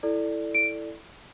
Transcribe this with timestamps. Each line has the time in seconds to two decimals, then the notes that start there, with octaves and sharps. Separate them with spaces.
0.03 E4 A4 D5
0.55 D7